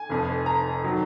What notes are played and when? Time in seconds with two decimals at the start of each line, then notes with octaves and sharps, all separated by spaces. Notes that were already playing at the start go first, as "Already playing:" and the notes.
Already playing: G#5
0.09 F1 F2 F3
0.46 A#5
0.84 D#3 F#3